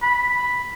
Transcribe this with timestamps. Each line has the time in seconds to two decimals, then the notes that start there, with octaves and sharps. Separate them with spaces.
0.03 B5